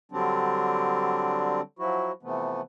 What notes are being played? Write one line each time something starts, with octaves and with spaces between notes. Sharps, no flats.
D3 F#3 G3 C4 D4
F3 F#3 E4 F#4
C3 E3 F3 A3 B3